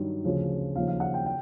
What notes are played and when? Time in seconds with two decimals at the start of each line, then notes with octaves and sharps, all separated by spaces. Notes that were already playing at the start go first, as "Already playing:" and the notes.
Already playing: G2 D#3 F#3
0.24 D2 C#3 F3
0.76 D#2 C#3 F3 F5
0.87 F5
1.00 F#5
1.14 G5
1.26 G5